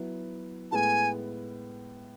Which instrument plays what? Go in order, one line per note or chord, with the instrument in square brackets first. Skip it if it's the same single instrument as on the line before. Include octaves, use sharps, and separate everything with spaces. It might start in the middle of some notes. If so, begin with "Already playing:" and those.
Already playing: [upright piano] F#3 B3 E4
[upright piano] A2 G#3 B3 [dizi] G#5 A5